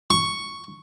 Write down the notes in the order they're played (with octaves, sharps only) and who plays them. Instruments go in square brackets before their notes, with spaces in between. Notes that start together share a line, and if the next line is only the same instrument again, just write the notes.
[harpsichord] C#6